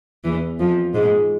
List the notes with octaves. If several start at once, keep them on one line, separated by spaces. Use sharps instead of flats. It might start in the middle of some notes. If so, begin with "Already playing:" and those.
E2 E3
F2 F3
G#2 G#3